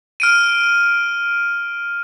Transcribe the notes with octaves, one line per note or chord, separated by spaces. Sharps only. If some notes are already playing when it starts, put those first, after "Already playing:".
F6 D7 D#7